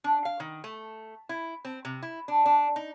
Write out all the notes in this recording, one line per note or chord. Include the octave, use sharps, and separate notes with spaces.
D4
F5
D#3
A3
E4
C4
C3
E4
D4
D4
D#4